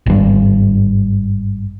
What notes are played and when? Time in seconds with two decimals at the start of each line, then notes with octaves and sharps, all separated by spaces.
0.06 G#1 G2